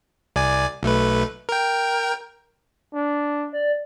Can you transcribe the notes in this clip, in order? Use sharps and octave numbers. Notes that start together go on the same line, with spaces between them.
C2 D5 G#5
B1 A3 B4
A#4 G5
D4
D5